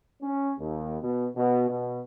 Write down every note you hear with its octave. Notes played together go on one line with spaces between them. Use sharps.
C#4
D#2
B2
B2
B2